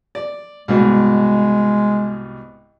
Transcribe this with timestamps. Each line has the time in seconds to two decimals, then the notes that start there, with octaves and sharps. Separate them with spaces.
0.15 D5
0.68 C2 G#2 B2 G#3